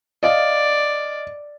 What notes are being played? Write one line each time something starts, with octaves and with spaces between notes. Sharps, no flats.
D5 D#5 F5 A6